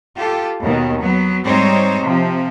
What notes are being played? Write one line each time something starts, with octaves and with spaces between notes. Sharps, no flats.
F4 G4 A4
D#2 B2 D#3
F#3 B3
G#2 G3 C4 D#4 C5 C#5
C3 F3